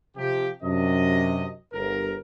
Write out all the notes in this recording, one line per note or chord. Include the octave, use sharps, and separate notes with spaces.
C3 F3 G4
F#2 C3 D4 D#5
G1 A#4